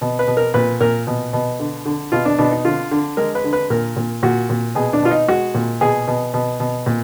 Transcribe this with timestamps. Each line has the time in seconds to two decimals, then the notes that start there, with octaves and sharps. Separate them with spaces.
0.01 B2
0.19 B4
0.27 B2
0.37 A#4
0.54 A#2 B4
0.81 A#2 A#4
1.07 B2
1.33 B2
1.60 D3
1.86 D3
2.12 B2 F4
2.25 D4
2.38 B2 D4
2.51 D#4
2.65 D3 F4
2.91 D3
3.17 G#3 A#4
3.35 B4
3.44 D3
3.53 B4
3.70 A#2 A#4
3.97 A#2
4.23 A#2 F#4
4.50 A#2
4.75 B2 G#4
4.93 D4
5.02 B2 F4
5.11 D#4
5.28 G#3 F#4
5.55 A#2
5.81 B2 G#4
6.08 B2
6.34 B2
6.60 B2
6.86 A#2